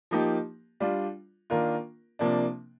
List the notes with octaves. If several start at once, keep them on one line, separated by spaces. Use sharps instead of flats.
F3 A#3 D#4 G4
G3 D4 F4
D#3 A#3 D4 F4 A#4
C3 F3 A#3 D4